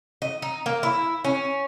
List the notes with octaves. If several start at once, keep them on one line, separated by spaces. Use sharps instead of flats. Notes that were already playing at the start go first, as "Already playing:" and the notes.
D#5
D#4
A#3
E4
C#4